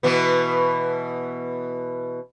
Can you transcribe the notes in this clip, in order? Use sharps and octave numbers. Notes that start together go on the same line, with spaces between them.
B2 E3 B3